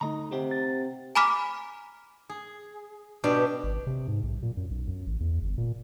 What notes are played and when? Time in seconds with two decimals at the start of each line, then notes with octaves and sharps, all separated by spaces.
0.01 D2 D3 A3 D#4 D#5 A#5
0.32 C3 C4 G4 F#5
0.51 A6
1.15 G#5 A#5 B5 D6 F6 B6
2.29 G#4
3.24 B2 D4 G4
3.63 G#1
3.87 C3
4.08 G#2
4.23 B1
4.42 A#2
4.57 F#2
4.70 B1
4.87 F#2
5.07 A1
5.20 E2
5.41 G1
5.58 A#2